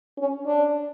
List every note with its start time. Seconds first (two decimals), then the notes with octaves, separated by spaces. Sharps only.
0.18 C#4
0.46 D4